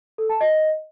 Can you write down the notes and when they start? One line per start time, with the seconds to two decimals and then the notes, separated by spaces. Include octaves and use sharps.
0.18 A4
0.29 A5
0.41 D#5